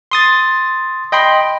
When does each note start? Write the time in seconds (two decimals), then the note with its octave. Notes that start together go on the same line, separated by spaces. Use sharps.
0.11 C6 D#6 A6
1.12 D#5 G5 B5 C6